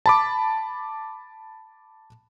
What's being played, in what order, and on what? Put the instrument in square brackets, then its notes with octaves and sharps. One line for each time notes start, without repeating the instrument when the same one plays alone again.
[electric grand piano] A5 B5 D6